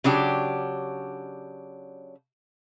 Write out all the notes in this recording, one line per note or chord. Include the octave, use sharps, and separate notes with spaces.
C#3 F#3 D4 G4